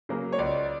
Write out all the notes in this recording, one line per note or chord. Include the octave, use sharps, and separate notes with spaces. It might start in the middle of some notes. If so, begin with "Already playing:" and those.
C#3 F#3 A#3
C#5
C#2 D5